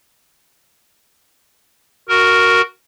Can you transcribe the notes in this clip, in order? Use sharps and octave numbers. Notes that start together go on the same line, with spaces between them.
F#4 A#4